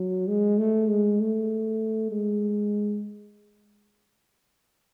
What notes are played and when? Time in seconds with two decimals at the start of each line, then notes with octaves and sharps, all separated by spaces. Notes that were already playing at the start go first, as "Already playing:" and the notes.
Already playing: F#3
0.28 G#3
0.58 A3
0.89 G#3
1.20 A3
2.12 G#3